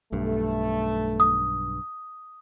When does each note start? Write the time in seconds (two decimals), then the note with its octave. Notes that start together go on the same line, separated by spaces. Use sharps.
0.13 B1 G2 A3
1.20 D#6